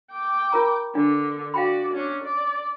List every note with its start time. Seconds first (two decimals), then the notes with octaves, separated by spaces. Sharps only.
0.12 G5 D6
0.52 F4 A#4 A#5
0.95 D3 D4
1.54 F#4 D5 F5 G5 B5
1.94 C#4 D4
2.24 D5